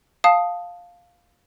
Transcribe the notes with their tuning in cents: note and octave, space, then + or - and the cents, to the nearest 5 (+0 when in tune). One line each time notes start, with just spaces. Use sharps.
F5 +10 A5 +0 D#6 +0